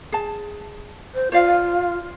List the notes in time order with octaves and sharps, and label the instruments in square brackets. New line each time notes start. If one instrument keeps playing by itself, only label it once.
[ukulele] G#4 A5
[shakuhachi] C5
[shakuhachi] F4 [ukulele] C5 D5 F5